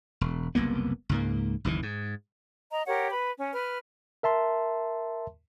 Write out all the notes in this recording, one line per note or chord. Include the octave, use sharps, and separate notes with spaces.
E1
F#1 C2 A#3 B3
C#2 G#2 A#3
F#1 D#2 A#2 E3
G#2
D#5 A#5
G4 A#4 C#5 F#5
B4 B5
C#4
B4 F6
A#4 E5 A5 C6